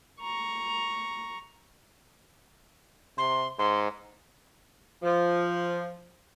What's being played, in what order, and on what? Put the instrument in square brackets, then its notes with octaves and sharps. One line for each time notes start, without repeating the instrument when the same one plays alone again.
[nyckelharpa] A#5 C#6
[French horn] C3 [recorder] C6
[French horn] G#2 [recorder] C6
[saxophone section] F3